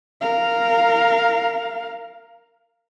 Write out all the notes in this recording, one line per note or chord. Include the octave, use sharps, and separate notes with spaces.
A#4 F5